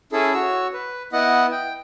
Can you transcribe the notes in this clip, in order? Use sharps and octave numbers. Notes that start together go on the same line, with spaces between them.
C#4 E4 G#4 A4
F#4 C#5 E6
B4
B3 E4 D#5 F#5
G5